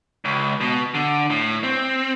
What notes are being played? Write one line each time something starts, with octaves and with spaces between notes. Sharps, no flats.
C#2
B2
D3
A2
C4